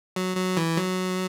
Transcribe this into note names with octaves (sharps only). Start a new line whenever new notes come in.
F#3
F#3
E3
F#3